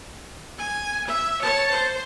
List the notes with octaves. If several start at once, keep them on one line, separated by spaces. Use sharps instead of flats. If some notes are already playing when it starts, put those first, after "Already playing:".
G#5
E5
C#5 A5
C5